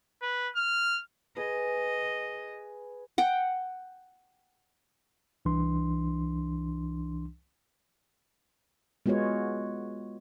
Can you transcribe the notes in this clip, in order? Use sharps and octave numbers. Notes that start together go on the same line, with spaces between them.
B4
F6
G#4 B4 D#5
F#5 G5
C2 E3 D4 C6
G#3 B3 F4 F#4 C#5